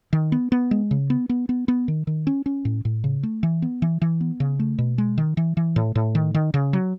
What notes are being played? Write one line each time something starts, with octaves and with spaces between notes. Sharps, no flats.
D#3
B3
B3
G#3
C#3
B3
B3
B3
B3
D#3
D#3
C#4
C#4
A2
A2
C#3
A3
E3
B3
E3
E3
B3
C#3
A3
B2
G#3
D#3
E3
E3
A2
A2
D#3
D#3
C#3
F#3